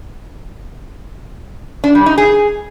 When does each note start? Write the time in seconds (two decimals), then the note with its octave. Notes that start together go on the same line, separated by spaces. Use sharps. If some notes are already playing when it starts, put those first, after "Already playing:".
1.84 D4
1.95 G3
2.06 D#4
2.18 G#4